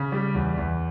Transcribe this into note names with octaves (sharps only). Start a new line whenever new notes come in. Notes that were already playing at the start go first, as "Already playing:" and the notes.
Already playing: C#3
G3
E2
E2